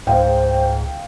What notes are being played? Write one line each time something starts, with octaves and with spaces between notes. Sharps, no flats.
C#2 G#2 C5 F5 G5